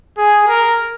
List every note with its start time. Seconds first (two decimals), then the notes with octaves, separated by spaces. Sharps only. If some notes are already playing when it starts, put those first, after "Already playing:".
0.18 G#4
0.48 A#4